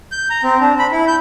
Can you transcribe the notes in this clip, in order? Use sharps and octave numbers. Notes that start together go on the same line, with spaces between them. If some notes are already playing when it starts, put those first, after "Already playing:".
G6
A#5
C4
D4
B5
E4
G6